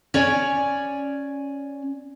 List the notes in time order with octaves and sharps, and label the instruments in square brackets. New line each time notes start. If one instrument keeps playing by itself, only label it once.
[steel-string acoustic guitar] C#4 C#5 D5 G#5